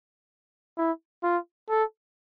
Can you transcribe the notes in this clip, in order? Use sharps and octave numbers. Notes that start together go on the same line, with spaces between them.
E4
F4
A4